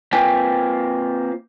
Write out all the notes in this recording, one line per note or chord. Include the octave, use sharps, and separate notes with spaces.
A#3 C4 F4 B4 G5 G#5